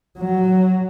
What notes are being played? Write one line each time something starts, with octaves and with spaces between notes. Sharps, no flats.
F#3